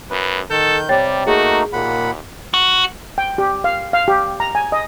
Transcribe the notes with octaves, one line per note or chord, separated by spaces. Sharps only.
F#2 B4
D#3 A4 G6
C3 G3 C#5 G5 A6
A3 A#3 D#4 F#4 G#4
D#2 A#2 F#5 B5
F#4
G5
G4
F5
F5
G4
A#5
G#5
D#5